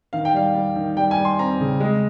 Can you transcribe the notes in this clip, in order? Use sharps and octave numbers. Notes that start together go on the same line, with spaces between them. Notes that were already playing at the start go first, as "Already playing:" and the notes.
D#3 F5
G5
G3 F5
G3
D#3
G3 G5
G#5
G3
C6
C4 A#5
C#3
G#3